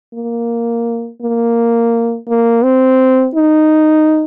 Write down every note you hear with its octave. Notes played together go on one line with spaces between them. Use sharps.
A#3
A#3
A#3
C4
D#4